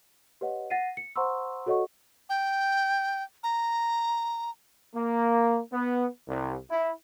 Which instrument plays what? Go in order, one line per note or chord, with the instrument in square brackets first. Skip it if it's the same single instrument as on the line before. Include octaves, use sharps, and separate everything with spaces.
[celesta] G4 B4 C#5 D#5 F#5
F#5 A6 A#6 C7 D#7
C#7
C5 F#5 A#5 C6 C#6 E6
F#4 A4 C#5 D#5 F#5 C#6
[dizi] G5
A#5
[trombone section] A#3
B3
C2
E4